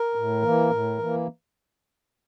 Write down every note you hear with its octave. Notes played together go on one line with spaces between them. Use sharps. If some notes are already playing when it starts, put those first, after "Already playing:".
Already playing: A#4
A2
E3 A#3
A2
E3
A#3